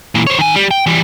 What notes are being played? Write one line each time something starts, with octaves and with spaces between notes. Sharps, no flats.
A#2 E3
C5 C#5
D#3 G#5
G3
G5
E3 G3